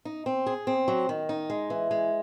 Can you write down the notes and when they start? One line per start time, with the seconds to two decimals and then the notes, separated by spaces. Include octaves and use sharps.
0.05 D#4
0.26 C4
0.46 G#4
0.67 C4
0.88 F#3
1.09 D#3
1.29 D#4
1.50 G#3
1.70 E3
1.91 G#3